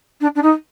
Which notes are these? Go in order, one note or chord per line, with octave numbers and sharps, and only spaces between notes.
D4
D4
D#4